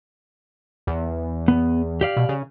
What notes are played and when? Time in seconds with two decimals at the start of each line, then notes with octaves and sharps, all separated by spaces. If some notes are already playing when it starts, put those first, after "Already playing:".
0.87 E2
1.48 B3
2.01 G4 D5 F5
2.17 B2
2.29 C#3